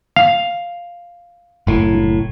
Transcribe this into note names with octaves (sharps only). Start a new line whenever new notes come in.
F5
F#1 A2